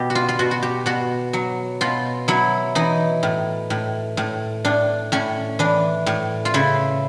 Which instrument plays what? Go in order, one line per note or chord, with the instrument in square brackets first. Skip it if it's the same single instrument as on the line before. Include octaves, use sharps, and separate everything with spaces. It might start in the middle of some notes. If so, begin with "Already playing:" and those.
Already playing: [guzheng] B2 G4
F#4
F4
F4
B2 F#4
F#4
G4
B2 F#4
F#3
B2 F4
F#3 E4
E3 D#4
A2
A2
A2
A2 D4
A2 C#4
E3 D4
A2
F4
C#3 E4